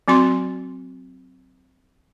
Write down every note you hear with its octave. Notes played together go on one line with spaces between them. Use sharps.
F#3 C4 F#4 C6